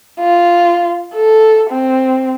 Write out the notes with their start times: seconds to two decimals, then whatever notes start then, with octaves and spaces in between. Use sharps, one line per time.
0.20 F4
1.15 A4
1.70 C4